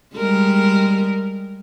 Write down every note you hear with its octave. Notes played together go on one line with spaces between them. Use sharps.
G3 G#3 A#4